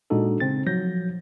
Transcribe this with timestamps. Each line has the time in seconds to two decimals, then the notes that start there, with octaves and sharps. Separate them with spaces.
0.10 A#2 G#3 D4 D#4 F#4 A4
0.40 C#3 C4 A6
0.67 F3 F#3 G6 A#6